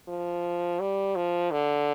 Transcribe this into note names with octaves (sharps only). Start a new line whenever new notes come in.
F3
G3
F3
D3